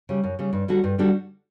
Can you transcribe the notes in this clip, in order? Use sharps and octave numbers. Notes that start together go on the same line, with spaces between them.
C#3 G3
F#2
C#3 G3
G2
D3 G3 D4 F#4
G2
D3 G3 D4 F#4